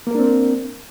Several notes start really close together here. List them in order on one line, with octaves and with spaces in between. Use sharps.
A#3 A#4 D4 C4